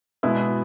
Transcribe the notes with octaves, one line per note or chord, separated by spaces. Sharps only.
B2 G#3 B3 E4